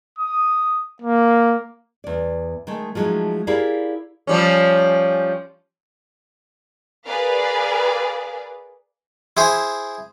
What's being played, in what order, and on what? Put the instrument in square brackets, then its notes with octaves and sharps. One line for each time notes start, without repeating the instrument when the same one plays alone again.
[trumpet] D#6
A#3
[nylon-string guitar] E2 D5
D#3 G#3 A3
F3 F#3 G#3 A3 D#4
E4 G4 G#4 A#4 D5 F5
[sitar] F3 G3 C#4
[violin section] G#4 A#4 B4 D5 F5
[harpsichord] E4 G#4 C5